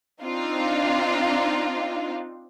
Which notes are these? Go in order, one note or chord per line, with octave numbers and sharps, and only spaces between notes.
C4 D4 D#4 F4